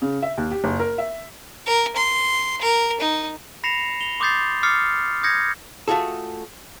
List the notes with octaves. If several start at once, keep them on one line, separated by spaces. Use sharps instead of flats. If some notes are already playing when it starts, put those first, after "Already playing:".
C#3
E5
D#2
G4
F#1
A#4
E5
A#4
C6
A#4
D#4
B5 A#6 C7 C#7 E7 F7
F7 G7
C6 D6 D#6 G6 A6 C7
D6 D#6 F6 A6 C7 C#7
D#6 G6 G#6 A#6 C#7
A3 F4 F#4 G#4 A4